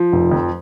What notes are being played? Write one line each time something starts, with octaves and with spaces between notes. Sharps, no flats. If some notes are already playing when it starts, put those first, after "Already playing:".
Already playing: F3
F1
F2